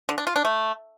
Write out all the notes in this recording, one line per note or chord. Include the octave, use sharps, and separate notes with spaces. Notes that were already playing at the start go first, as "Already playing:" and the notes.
D3
D4
F4
D4
A3